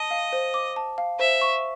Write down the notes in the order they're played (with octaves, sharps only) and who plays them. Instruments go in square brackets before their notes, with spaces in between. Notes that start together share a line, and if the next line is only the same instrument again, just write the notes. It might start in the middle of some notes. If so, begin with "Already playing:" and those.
Already playing: [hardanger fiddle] D#5 [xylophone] A5
[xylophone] F5
C5
D6
A5
F5
[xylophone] C5 [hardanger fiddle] E5
[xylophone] C#6